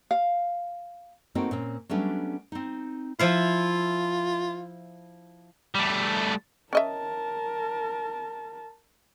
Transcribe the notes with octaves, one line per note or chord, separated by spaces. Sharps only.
F5
A3 A#3 C4 D#4 F#4 G5
A#2 C4 C#4
F#3 G3 A3 B3 C#4 D4
C4 D#4
F3 E4 F4 F5
G3 A3
C#4 A#4 D#5 E5 A5